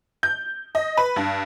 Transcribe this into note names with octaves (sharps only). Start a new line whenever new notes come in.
G6
D#5
B4
G2